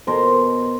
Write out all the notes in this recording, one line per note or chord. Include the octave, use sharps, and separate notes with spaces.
B2 A#4 C5